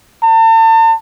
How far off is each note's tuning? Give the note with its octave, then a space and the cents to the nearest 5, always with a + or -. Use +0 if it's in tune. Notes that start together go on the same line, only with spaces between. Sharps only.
A5 +40